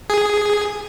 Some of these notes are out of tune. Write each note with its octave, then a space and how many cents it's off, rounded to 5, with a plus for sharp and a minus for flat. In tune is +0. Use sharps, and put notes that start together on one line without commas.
G#4 +0